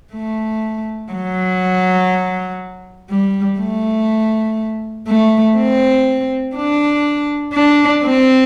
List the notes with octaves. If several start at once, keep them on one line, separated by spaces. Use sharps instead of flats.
A3
F#3
G3
A3
A3
C4
D4
D4
C4